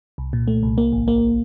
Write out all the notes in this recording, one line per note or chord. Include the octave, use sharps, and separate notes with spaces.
C2
A#2
A3
C2
A#3
A1
A#3